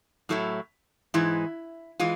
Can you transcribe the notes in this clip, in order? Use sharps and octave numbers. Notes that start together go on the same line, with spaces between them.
A2 F#3 A3 C4 E4
G#2 E3 G#3 E4
E3 G#3 F4